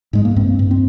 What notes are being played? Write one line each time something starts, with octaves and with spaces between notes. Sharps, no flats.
G#2 G#3
A#3
G2 C4
G2
C4